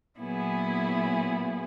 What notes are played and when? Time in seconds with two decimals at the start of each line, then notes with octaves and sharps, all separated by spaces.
0.19 A#2 F#3 B3 E4 G#4